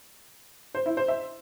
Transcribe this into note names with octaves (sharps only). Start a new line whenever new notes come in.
C5
E4
C5
E5